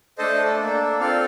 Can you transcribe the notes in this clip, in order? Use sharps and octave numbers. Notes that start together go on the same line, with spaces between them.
A3 D4 A4 C5 D#5
A#3 D4 A4
C4 F4 A4 D5 F5